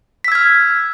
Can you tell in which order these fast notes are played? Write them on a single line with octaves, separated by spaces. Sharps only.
B6 E6 G#6 F6